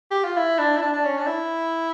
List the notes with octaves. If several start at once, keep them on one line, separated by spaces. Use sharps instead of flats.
G4
F4
E4
D4
E4
D4
D4
C#4
D4
E4